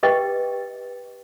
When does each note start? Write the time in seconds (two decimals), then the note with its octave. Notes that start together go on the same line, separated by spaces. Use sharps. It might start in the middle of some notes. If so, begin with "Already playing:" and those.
0.03 G4 B4 D#5 G5